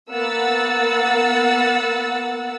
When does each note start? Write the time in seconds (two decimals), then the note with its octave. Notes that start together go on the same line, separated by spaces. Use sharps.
0.11 A#3 B3 F#5 E6 A6